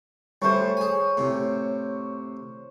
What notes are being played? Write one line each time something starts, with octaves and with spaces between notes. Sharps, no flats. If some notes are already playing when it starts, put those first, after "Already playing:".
G3 A3 C5 C#5
G#4 G#5
A2 C3